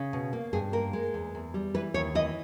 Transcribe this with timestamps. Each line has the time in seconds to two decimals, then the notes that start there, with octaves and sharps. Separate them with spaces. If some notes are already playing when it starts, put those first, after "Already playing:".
Already playing: C#3
0.13 B2
0.33 A#3
0.53 G2 G#4
0.73 A#3 A#4
0.93 G#3
1.14 E2
1.35 E2
1.54 G3
1.74 E3 B4
1.94 D#2 C#5
2.15 E3 D#5